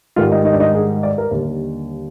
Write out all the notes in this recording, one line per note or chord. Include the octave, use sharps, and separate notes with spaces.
G#2 D#3 G3 F4
D#4
D#4
D4
D#4
G#4
D5
A#4
D#2 D3 G3